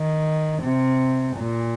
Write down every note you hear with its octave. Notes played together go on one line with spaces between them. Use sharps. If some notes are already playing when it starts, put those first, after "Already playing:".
Already playing: D#3
C3
A#2